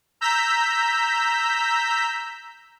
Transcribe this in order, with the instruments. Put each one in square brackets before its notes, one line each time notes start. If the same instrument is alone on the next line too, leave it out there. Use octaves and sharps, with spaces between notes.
[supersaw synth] A#5 E6 G6 B6